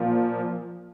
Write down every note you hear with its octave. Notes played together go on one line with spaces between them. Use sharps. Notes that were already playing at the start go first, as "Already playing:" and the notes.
Already playing: A#2 F3